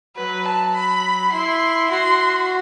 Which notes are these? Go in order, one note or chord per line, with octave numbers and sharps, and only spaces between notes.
F#3 B4
A5
B5
E4 C6
F#4 C6